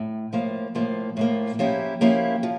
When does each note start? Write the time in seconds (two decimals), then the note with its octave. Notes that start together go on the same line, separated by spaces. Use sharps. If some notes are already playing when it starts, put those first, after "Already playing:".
Already playing: A2
0.33 A2 F3 A#3
0.75 A2 F3 A#3
1.17 A2 F3 A#3
1.59 F3 A#3 C#4 E4 G4
2.01 F3 A#3 C#4 E4 G4
2.43 F3